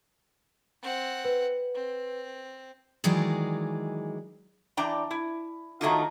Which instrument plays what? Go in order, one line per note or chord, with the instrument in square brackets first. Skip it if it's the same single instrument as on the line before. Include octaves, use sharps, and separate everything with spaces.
[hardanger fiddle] C4 F#5
[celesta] B4
[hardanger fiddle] C4
[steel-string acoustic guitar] D#3 E3 F#3 G#3 G#4 D5
[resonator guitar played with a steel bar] E3 D4 D5 G5 A#5
E4
D#3 F#3 A3 A#3 D#4 F4